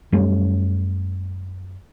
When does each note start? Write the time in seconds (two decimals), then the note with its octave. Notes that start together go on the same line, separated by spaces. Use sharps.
0.12 F#2 G3 A3 C#4